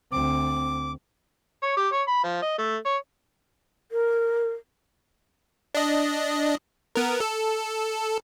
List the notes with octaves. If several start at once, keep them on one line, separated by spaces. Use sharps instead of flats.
D2 C4 D6
C#5
G4
C#5
B5
F3
D#5
A3
C#5
A#4
D4 D#5
B3 A#4
A4